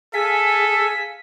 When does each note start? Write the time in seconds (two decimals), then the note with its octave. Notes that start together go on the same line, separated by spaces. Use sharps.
0.14 G#4 A4 F5 G#5 B6